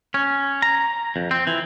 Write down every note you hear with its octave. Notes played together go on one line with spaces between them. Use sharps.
C#4
A#5
F2
C4
E3